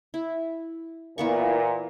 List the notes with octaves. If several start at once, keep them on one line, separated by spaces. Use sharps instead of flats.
E4
A#2 E3 B3 C#6